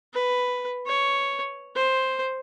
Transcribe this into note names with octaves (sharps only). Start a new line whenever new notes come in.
B4
C#5
C5